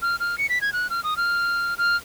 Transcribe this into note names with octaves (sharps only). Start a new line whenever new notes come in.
F6
F6
C#7
B6
G#6
F#6
F6
D#6
F6
F6